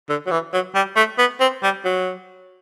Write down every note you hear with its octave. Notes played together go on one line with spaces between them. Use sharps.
D3
F#3
E3
F#3
G3
A3
B3
C4
G3
F#3